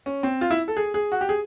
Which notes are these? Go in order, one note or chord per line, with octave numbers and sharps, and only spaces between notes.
C#4
C4
F4
E4
A4
G#4
G#4
F#4
G4
G#4